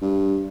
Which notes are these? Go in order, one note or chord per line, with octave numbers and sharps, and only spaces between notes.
G2